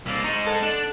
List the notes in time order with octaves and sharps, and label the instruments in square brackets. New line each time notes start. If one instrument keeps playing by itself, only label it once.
[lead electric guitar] C2 A#3 [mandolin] D5 E5
[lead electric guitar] G#3 D#4 [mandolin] A#5 C#6
[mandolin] A4 F#5
[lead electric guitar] D4